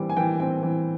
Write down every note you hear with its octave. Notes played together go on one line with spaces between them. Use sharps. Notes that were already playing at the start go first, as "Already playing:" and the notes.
Already playing: E3 G3 C4 D6
G#5
E3 G5
C4 G5
E3